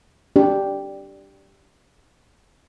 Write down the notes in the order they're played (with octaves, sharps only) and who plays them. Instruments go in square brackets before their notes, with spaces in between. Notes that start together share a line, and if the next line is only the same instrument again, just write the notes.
[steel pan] D4 G4